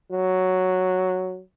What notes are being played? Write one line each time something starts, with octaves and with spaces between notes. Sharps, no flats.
F#3